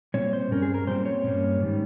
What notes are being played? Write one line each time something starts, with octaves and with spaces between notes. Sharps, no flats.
A#2 G3 C4 C#5
C5
G2 G3 C#4 A#4
G#4
A#4
A#2 G3 C4 C5
C#5
G2 G3 A#3 C#4
G#2 D#3 G3